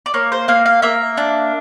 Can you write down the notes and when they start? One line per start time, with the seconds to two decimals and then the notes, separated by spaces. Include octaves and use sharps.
0.06 D5
0.14 A#3 C#5
0.32 C5
0.48 A#3 F5
0.66 F5
0.82 A#3 E5
1.17 D4